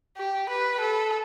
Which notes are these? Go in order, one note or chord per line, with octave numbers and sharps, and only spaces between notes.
G4
B4
A4